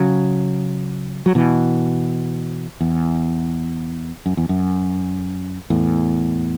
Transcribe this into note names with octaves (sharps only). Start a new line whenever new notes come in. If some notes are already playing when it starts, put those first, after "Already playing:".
Already playing: C#3 F#3
F#3
B2 E3
E2
F#2
E2
F#2
E2 A2